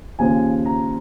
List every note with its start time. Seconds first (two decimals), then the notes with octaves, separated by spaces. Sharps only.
0.19 D#2 C#3 F3 G#5
0.65 A#5